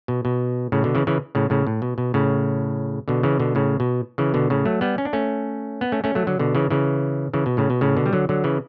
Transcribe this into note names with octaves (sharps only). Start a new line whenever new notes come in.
B2
B2
A2 C#3
B2 D3
C#3 E3
C#3 E3
A2 C#3
A2 C#3
A2
B2
B2
A2 C#3
B2 D3
C#3 E3
B2 D3
A2 C#3
B2
C#3 E3
B2 D3
A2 C#3
F#3 A3
G3 B3
C#4
D4
A3 C#4
B3
A3 C#4
A3 C#4
F#3 A3
D3 F#3
B2 D3
C#3 E3
C#3 E3
C#3 E3
B2
A2 C#3
B2
A2 C#3
B2 D3
G3
D3 F#3
D3 F#3
C#3 E3